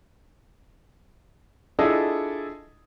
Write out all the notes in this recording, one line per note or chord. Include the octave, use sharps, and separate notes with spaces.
D4 E4 F4 G#4 A4 D#5